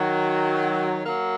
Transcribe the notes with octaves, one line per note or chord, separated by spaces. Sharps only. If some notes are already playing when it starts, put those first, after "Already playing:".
Already playing: D#3 F#3
F#3 A#3